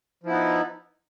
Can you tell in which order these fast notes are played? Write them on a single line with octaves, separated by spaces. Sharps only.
F3 E4 B3 D#4